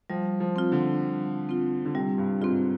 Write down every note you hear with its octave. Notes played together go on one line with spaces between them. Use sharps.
F3 G3
F3
C4 F4
D3
G3
C4 F4
D3
C3 G3
G2
G#2 C4 F4